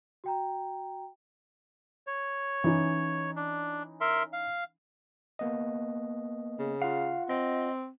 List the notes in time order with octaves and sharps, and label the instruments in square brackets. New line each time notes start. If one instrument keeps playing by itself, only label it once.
[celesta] F#4 G5 A#5
[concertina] C#5
[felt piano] E3 C#4 D#4
[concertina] D4
A#4 E5 C6
F5
[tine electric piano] A#3 B3 D#5
[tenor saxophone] C#3
[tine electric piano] F4 F#5 [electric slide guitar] F5
[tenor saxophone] C4 [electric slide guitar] D#5